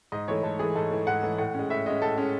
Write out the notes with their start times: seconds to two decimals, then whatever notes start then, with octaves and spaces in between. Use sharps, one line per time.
0.12 G#2 D#5
0.28 E3 A3 C#5
0.43 G#2 A4
0.59 E3 A3 G#4
0.75 G#2 A4
0.91 E3 A3
1.07 G#2 F#5
1.23 E3 A3
1.38 A2 F#5
1.54 G#3 C#4
1.70 A2 E5
1.86 G#3 C#4 D#5
2.02 A2 A4
2.18 G#3 C#4